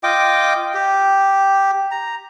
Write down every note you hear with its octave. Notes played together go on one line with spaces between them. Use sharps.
F4 D#5 G5 D6
G4
A#5